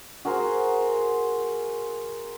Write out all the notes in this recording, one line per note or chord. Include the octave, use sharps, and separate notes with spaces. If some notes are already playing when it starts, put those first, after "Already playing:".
F#4 G#4 A#4 C5